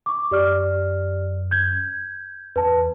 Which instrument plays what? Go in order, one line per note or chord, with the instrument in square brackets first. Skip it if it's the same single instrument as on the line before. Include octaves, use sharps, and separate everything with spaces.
[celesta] C#6 D6
[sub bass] F#2 [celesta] G4 D5 F6
[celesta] G6 G#6
[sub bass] E2 [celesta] B4 A5